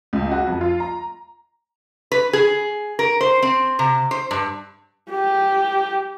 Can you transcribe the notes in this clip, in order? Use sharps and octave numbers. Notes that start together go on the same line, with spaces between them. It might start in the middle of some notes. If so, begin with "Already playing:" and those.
C#2
F#4
F2
F4
A#5
B4
G#4
A#4
C5
C4
C3
C5
G2
G4